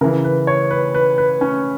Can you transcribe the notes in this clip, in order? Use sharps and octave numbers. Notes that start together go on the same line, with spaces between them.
C#3 E3 A#4
B4
C#5
B4
B4
B4
C#4